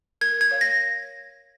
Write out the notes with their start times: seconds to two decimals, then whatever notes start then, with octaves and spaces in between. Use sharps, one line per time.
0.21 A#4 G#6
0.41 G#6
0.51 C#5 F5
0.61 A#6